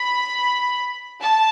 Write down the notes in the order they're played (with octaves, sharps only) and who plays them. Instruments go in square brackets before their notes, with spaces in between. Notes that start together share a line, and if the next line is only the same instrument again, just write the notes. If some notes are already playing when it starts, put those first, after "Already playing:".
Already playing: [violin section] B5
A5